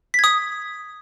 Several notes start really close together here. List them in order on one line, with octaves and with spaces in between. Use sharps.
B6 G#6 D#6